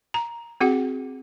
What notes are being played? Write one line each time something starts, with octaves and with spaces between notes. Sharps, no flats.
A#5
C4 F#4 G#4 F#5